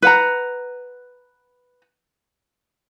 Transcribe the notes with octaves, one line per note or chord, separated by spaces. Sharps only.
B4 F#5 A#5